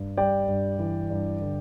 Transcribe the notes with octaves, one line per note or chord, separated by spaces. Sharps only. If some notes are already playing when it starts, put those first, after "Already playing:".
Already playing: G2
G3 D5 G5
G2
E3
G2
D3